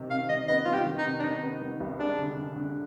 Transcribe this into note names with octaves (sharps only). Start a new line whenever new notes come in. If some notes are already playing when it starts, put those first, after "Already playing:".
Already playing: C3 D#3
C3 F5
D#3 D#5
B3 D#5
D#3 F4
G4
D#3
D#4
C3
D4
D#3 D#4
B3
D#3
C2
G#3 D4
D3
D3
D3